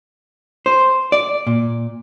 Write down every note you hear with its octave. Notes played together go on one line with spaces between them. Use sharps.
C5
D5
A#2